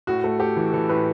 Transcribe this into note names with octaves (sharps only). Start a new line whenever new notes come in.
A2 F#4
A3
A3 G4
E3
E3 A4
A2 B4